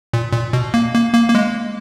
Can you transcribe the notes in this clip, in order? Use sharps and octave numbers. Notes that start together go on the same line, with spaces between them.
A#2
A#2
B2
A#3
A#3
A#3
A#3
G#3